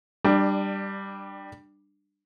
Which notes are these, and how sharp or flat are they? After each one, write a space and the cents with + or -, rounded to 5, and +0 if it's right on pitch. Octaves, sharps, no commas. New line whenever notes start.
G3 +0 D4 +25